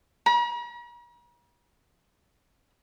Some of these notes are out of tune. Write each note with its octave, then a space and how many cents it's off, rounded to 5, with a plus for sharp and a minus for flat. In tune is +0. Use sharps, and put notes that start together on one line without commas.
A#5 +45